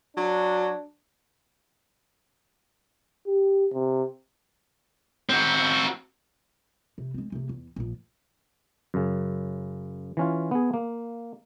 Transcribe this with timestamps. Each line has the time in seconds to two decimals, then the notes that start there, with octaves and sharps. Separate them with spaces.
0.17 F#3 D4
3.27 G4
3.73 C3
5.29 C4 F#4
6.98 C3
7.14 G#3 C4
7.32 C3 A#3
7.49 E2
7.76 A#1 F3
8.94 F#2 C#3
10.17 E3 C#4 F4
10.51 B3 G#4
10.74 A#3